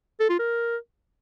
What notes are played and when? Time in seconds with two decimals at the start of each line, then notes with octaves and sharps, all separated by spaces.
0.20 A4
0.30 F4
0.39 A#4